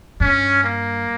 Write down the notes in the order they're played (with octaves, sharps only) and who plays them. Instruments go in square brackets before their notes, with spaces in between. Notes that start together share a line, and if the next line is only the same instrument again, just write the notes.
[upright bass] G2 [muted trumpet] C#4
[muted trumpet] A#3